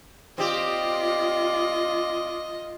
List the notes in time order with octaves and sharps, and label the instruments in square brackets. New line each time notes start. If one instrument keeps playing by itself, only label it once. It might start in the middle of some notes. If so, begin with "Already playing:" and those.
[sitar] C4 G4 [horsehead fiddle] F4 [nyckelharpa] D5 [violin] D#5